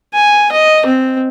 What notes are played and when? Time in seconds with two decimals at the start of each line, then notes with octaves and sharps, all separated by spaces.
0.14 G#5
0.52 D#5
0.86 C4